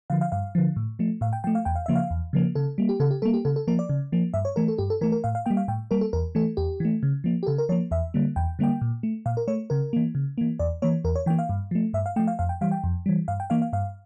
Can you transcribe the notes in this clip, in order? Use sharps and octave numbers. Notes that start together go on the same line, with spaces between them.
D3 F3 F5
F5
G2 F5
D3 F3
A2
F3 A3
A2 F5
G5
F3 A3 G5
F5
E2 G5
F5
C#3 F3 A#3 E5
F5
E2
C#3 F3 A#3
C#3 A4
G3 A#3
G4
C#3 A4
G4
G3 A#3 A4
G4
C#3 A4
A4
F3 A#3 A#4
D5
C#3
F3 A#3
G2 E5
C#5
E3 A3 A#4
A4
G2 G4
A4
E3 A3 A#4
A#4
A2 F5
F5
G3 A#3 G5
F5
A2 G5
G3 A#3 A#4
A4
E2 A#4
E3 A3 A4
E2 G4
E3 A3
C#3
F3 A#3
G4
C#3 A4
A#4
F3 A#3 C#5
E2 E5
D3 G3 A#3
E2 G5
D3 G3 A#3 G5
A#2
A3
A#2 F5
A#4
A3 C#5
C#3 A#4
E3 A#3
C#3
E3 A#3
E2 D5
E3 A#3 C#5
E2 A#4
C#5
E3 A#3 G5
F5
G2
F3 A3
G2 E5
F5
F3 A3 G5
F5
F2 F5
G5
E3 G3 F5
G5
F2
E3 G3
G2 F5
G5
E3 A#3 F5
F5
G2 F5